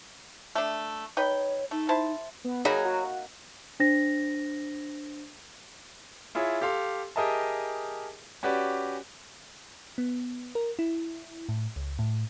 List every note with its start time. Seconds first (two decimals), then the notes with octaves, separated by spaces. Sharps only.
0.55 A3 D4
1.17 D#4 B4 C#5 G5
1.71 A3 D#4
1.89 E4 C5 A5
2.44 B3
2.65 F#3 A#3 D#4 G#4 B5
2.85 F#4
3.80 D4 C5 A#6
6.35 E4 F4 G#4 C#5 E5
6.61 G4 A4 F5 C6
7.16 G4 G#4 A#4 D#5 E5 A5
8.43 C#4 F#4 G4 B4 D5
9.98 B3
10.55 A#4
10.79 E4
11.49 A2
11.76 C#2
11.99 A2